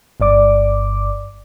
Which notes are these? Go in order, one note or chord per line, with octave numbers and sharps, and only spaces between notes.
G1 G2 D5 D6